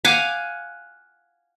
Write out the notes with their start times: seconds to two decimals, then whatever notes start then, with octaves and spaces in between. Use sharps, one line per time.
0.05 F5 F#5 G#5 D6